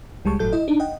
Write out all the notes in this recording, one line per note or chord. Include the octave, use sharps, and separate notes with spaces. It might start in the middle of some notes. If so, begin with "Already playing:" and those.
C#2 G3 G#3 A5 C#6
G1 A2 F#3 A4 G6
E4 D#5
D4 D#4
D#5 F#5 G5